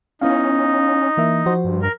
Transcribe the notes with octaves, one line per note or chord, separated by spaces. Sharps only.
B3 C#4 D#4 E4 F5
E3 A#3 E5
F3 F#4 C5
G2
A#4